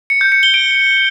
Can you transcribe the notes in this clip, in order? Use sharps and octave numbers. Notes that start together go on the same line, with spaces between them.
C#7
G6
C#7
G7
D7